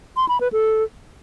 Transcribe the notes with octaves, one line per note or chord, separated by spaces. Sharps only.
C6
B5
B4
A4